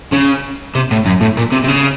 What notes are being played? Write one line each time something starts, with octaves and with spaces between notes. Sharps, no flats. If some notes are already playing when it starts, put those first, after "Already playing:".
C#3
C3
A2
F#2
A2
A#2
C3
C3
C#3